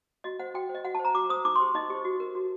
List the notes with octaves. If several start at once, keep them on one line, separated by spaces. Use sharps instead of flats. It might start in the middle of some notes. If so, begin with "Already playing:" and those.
F#4 D#5
C5 F#5
F#4 G5
C5
D#5
F#4 F#5
A5
C5 A#5
F#4 D6
C5 D#6
D#4 D6
C6
G4 C5
D#4 D#5
G4 C5
F#4
A#4
F#4